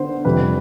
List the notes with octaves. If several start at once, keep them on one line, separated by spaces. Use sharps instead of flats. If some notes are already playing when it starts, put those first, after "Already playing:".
Already playing: D3 B3 C5
F2 C3 G3 B4